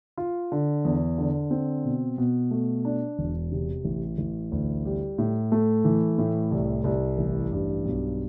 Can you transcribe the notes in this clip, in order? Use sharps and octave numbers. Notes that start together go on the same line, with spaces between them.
F4
D3
E2
D3
C4
B2
B2
A3
D4
E1
C3
A1
A1
D2
G3
A2
A3
E3
A2
C2
C2
A1
G2
B1